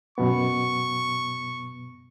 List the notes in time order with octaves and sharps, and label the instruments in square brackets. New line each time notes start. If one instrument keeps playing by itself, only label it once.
[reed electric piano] F#2 B2 B3 [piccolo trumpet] C#6